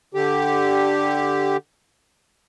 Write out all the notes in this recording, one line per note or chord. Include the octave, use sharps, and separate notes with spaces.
D3 G4